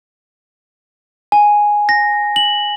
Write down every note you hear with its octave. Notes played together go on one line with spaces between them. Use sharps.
G#5
A#6
F#7